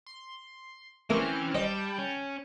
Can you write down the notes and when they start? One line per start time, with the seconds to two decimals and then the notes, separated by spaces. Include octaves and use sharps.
0.06 C6
1.10 E3 A3 A#3 C4 C#4 F6
1.54 G3 C5 D#5 G5 A5 G6
1.98 C#4